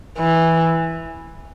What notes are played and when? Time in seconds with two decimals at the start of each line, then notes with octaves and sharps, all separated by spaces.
0.18 E3